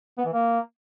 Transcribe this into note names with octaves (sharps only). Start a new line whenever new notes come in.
B3
E3
A#3